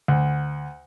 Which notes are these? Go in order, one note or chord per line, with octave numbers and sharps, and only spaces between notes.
D2